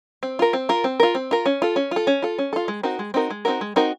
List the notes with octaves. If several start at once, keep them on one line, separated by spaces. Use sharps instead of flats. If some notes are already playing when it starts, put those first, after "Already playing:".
C4
F4 A#4
C4
F4 A#4
C4
F4 A#4
C4
F4 A#4
C#4
F4 A4
C#4
F4 A4
C#4
F4 A4
C#4
F4 A4
G#3
C4 D#4 F#4 A#4
G#3
C4 D#4 F#4 A#4
G#3
C4 D#4 F#4 A#4
G#3
C4 D#4 F#4 A#4